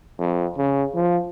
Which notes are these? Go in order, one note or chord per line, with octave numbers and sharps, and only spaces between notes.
F2
C#3
F3